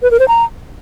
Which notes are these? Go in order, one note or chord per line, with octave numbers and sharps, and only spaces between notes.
B4
A#4
C5
A#5